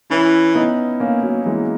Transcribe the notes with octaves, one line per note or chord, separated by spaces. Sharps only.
E3 C#4 E4
B3 D#4
A#3 C#4
F#3 A#3
E3 G#3